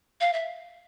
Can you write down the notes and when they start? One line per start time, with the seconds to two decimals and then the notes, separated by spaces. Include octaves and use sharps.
0.21 F5
0.33 E5